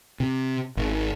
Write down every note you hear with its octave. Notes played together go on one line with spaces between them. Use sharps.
C3
G#1